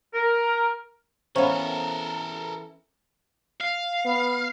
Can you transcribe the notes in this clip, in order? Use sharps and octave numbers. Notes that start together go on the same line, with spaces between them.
A#4
E3 B3 C#4 A4 A#4 C5 F5
F5
B3